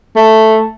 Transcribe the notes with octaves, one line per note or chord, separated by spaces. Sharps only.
A3